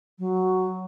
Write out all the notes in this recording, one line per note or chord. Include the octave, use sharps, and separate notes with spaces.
F#3